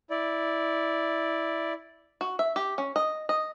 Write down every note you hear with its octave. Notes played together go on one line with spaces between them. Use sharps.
E4 D5
F#4
E5
G4
C#4
D#5
D#5